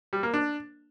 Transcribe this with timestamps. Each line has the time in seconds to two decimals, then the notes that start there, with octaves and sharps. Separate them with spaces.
0.13 G3
0.23 A#3
0.34 D4